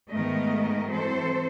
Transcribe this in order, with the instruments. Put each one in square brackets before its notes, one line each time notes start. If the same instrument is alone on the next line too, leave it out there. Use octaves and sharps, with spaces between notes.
[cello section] G#2 D#3 A3 B3 A#4 D#5
E3 F#3 C4 A4 C5